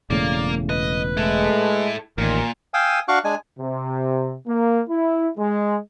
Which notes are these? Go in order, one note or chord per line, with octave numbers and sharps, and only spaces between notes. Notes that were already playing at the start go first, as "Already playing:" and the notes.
E1 A2 C#3 A#3 D5
B4 D#5
G#3 A3 E4 A4
A1 D#2 A#2 A#4
F5 G5 G#5 D#6 E6
D4 F#4 F5 C#6 D6 F#6
G#3 D4 G#5
C3
A#3
E4
G#3